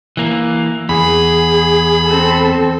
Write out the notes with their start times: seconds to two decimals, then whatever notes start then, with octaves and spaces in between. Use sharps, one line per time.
0.17 E3 A#3
0.89 E2 G#4 B5
2.06 C4 A4